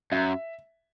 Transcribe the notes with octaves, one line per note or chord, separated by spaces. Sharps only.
F#2 E5